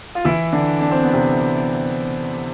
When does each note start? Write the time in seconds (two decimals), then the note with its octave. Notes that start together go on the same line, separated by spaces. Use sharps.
0.15 F4
0.25 E3 E4
0.53 D3 D4
0.81 D4
0.91 C4
1.02 B3
1.13 C3 C4